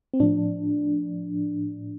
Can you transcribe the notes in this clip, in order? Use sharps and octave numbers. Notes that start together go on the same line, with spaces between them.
C4
A2 F3 D4